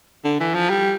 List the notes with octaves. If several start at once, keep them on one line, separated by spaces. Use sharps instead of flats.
D3
E3
F3
G3